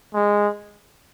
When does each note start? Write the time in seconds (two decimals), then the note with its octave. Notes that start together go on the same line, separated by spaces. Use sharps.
0.15 G#3